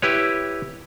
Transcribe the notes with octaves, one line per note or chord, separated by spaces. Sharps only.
E4 G4 B4 C#5